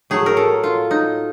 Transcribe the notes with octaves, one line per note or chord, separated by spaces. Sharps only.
A2 F#3 A3 G#4
A#4
A4
F4
D#4